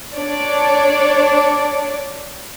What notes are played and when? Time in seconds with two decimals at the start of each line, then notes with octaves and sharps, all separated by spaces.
0.15 D4 C#5 D5